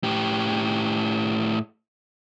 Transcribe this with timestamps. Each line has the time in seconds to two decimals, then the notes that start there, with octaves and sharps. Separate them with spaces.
0.03 A2 G4